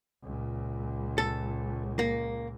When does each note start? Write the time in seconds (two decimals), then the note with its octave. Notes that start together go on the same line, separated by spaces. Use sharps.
0.23 C#2 A#2
1.18 A4
1.99 A#3